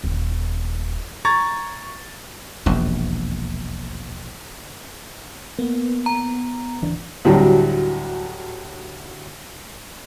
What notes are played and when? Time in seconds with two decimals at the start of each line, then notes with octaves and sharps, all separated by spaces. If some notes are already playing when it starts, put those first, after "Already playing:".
0.04 D#1 D#3
1.25 A#5 C#6 G#6 A6
2.66 E1 A#1 D#2
5.59 A#3 B3
6.06 A#5
6.82 D1 E3 D4
7.25 D2 A2 F#3 G3